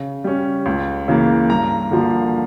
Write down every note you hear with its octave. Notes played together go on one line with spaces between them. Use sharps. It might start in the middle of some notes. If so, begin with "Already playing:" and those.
Already playing: C#3
G3 C#4
C#2
C#3 E3 A#3
G2 A#5
D3 F3 A#3